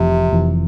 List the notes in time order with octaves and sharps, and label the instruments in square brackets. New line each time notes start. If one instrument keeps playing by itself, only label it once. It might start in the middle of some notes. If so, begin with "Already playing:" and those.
Already playing: [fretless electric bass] F1 F2 E3 [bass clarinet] C3
[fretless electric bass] F1 F2 E3